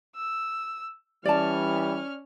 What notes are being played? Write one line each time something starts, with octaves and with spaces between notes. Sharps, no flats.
E6
E3 G3 C#4 D5 A5 F6